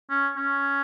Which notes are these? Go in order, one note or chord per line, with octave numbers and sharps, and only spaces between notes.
C#4
C#4